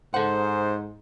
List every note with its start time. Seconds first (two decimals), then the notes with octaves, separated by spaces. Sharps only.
0.14 G#2 A4 C5 F#5